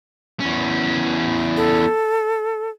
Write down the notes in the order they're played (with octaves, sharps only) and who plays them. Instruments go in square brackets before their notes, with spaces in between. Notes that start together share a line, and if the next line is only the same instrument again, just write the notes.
[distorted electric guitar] E2 C#4
[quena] A4